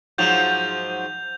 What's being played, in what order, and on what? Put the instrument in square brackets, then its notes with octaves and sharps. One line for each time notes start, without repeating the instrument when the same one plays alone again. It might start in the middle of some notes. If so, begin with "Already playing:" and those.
[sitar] G#2 F3 F#3 [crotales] G6 F7